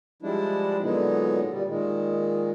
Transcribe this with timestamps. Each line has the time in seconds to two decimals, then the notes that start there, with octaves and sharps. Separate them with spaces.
0.22 F3 G3 G#3 D4 E4
0.82 A#2 D3 F#3 G#3 B3 D#4
1.50 A#2 G3
1.68 A#2 D#3 G#3